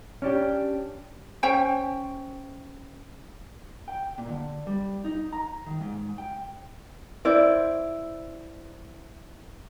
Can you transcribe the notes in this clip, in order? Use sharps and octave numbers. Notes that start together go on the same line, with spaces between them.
C#4 D4 G4
C#4 C5 G5 G#5
G5
A#2
D3
G3
D#4
A#5
D#3
G#2
G5
E4 C5 D5